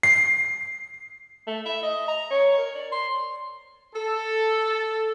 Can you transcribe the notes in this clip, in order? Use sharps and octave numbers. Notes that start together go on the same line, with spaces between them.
C7
A3
E5
D#5
A#5
C#5
A#4
D5
C6
A4